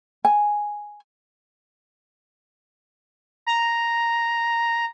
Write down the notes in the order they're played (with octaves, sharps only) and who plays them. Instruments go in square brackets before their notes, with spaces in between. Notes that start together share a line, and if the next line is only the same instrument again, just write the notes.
[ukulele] G#5
[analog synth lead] A#5